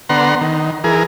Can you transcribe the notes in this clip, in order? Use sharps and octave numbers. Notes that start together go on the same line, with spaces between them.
D3 B3 F#5 A#5 C6
D#3
E3 G#4 A#4